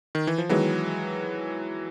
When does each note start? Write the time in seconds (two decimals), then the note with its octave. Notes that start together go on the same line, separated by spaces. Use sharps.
0.15 D#3
0.27 E3
0.38 F3
0.49 D#3 E3 F#3 G#3 B3